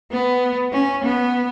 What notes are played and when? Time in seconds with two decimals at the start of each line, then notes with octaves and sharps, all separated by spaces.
0.12 B3
0.73 C#4
1.04 B3